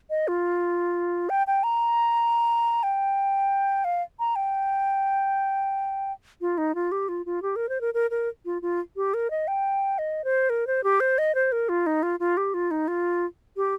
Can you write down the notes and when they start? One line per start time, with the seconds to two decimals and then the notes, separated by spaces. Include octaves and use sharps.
0.10 D#5
0.28 F4
1.29 G5
1.47 G5
1.64 A#5
2.83 G5
3.84 F5
4.19 A#5
4.36 G5
6.41 F4
6.58 D#4
6.75 F4
6.92 G4
7.09 F4
7.26 F4
7.42 G4
7.56 A#4
7.69 C5
7.81 A#4
7.94 A#4
8.11 A#4
8.45 F4
8.62 F4
8.96 G4
9.14 A#4
9.31 D#5
9.48 G5
9.98 D#5
10.24 C5
10.50 A#4
10.67 C5
10.84 G4
11.00 C5
11.18 D#5
11.35 C5
11.52 A#4
11.69 F4
11.86 D#4
12.03 F4
12.20 F4
12.37 G4
12.54 F4
12.71 D#4
12.88 F4
13.57 G4